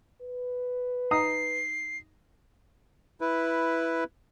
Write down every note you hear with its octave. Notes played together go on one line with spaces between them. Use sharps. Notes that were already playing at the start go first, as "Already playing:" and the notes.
B4
D#4 A#5 D#6 C7
E4 B4